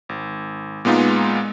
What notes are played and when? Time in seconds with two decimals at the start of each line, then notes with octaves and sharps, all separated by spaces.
0.09 G#1
0.85 A#2 G#3 B3 D#4 F4